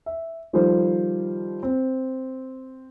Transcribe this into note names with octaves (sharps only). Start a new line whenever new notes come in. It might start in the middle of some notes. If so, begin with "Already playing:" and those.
E5
D#3 F3 G3 F4 A4 C5
C4